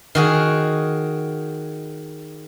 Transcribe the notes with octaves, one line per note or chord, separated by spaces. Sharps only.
D#3 F#4 G#4